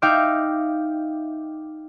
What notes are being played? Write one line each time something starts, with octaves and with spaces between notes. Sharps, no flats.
D#4 E5 F5 G5 D6